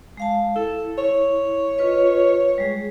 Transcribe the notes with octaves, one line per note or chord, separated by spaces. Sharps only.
G#3 F5 A5
E4 A4
C#5
F4 B4 D#5
G3 G#3 G#4